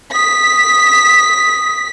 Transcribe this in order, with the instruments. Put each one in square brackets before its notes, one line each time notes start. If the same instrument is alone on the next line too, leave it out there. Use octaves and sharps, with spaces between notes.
[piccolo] D#6 [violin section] B6